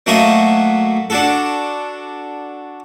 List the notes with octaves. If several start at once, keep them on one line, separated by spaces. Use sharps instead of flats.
F#3 A3 A#3 F#4 D#5 E5
D4 F#4 A4